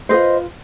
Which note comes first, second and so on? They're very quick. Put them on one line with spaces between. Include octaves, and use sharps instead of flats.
G#4 B4 C5 D#5 F4